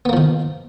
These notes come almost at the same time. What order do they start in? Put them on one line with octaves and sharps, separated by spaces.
B3 A#3 F3 D#3